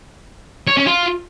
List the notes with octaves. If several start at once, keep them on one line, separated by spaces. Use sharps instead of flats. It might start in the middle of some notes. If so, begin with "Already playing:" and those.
C#5
C#4
F4